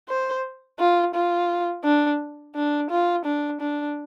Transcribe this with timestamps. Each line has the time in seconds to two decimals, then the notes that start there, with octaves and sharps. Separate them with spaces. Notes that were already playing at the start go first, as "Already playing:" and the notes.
0.09 C5
0.79 F4
1.14 F4
1.84 D4
2.55 D4
2.91 F4
3.25 D4
3.61 D4